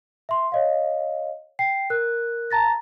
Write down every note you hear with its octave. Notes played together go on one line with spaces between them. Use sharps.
E5 C6
C#5 D#5 F5
G5 C7
A#4 F#6
A5 A#5 A6 A#6